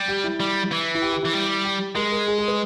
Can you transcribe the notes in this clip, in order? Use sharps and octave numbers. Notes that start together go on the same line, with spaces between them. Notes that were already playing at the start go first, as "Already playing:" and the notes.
Already playing: G3
G4
E4
G3
E3
E4
G4
G4
E3 E4
G3
G4
G#3 A#4
A#4
G#4
G#4
B4